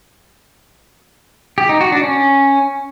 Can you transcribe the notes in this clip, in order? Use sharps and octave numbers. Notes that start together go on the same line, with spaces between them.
G4
D#4
F#4
D4
C#4